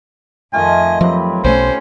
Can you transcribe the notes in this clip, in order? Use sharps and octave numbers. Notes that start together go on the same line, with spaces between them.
F2 D#3 A3 F4 D#5 G#5
F3 F#3 C4 G4 B4
B1 G3 A3 C#4 C5